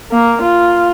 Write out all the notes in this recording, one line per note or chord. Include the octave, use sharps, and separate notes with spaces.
A#3
F4